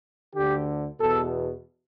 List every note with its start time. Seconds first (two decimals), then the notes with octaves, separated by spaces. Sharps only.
0.35 D2 D3 G4
1.00 E2 B2 A4